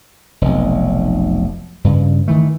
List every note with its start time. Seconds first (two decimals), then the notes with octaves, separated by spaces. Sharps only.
0.41 F1 B1
1.84 G2 C#3
2.28 D#3 E3 A3